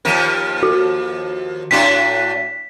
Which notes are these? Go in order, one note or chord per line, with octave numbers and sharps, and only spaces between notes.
D#2 F3 A#4
F#4
A2 D4 F#4 B6